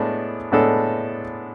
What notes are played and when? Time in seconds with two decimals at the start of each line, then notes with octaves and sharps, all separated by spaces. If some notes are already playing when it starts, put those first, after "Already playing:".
Already playing: A2 G#3 B3 D4 A4
0.52 A2 G#3 B3 D4 A4